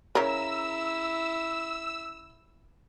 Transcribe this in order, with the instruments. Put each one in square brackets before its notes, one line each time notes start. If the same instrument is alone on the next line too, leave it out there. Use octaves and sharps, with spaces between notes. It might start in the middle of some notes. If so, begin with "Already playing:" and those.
[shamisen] C#3 A#4 [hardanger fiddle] E4 [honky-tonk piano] A#5 [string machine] E6